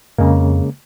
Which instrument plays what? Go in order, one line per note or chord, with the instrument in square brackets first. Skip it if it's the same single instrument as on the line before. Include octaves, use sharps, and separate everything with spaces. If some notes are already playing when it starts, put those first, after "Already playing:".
[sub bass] F2 [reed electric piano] C#3 G#3 A#3